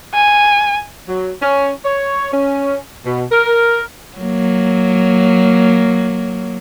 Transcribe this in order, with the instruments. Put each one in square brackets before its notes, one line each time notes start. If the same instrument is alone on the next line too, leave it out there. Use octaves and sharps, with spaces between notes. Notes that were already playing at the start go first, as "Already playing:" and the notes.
[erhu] G#5
[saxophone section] F#3
C#4
C#5
C#4
B2
A#4
[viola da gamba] F#3 A#3